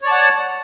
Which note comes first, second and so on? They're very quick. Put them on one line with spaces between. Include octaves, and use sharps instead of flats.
C#5 D5 A5 F#5